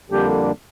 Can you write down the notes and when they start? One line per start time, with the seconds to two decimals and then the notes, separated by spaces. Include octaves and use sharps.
0.10 F2 D3 G3 A#3 D4 G4